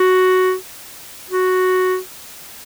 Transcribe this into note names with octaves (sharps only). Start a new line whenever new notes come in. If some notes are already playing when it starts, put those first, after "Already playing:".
Already playing: F#4
F#4